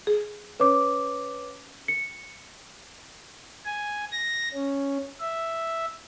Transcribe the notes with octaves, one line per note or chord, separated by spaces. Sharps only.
G#4
C#4 B4 C#5 D6
C#7
G#5
A#6
C#4
E5